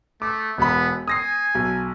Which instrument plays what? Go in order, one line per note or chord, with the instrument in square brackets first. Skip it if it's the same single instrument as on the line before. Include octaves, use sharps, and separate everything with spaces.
[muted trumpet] A3 [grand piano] D6
[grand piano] E1 B5 [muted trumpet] B3
[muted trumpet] G#5 [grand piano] D#6 A#6 C7
[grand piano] B1